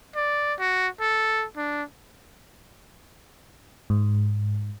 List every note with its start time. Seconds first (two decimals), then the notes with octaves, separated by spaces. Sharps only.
0.15 D5
0.59 F#4
1.00 A4
1.56 D4
3.90 G#2